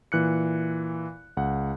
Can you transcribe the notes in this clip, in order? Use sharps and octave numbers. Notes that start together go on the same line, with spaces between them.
A#2 E3 F#6 C#7
C#2 F#5